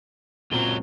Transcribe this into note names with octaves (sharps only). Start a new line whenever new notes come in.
C#2 A#2 F#3 C4 G7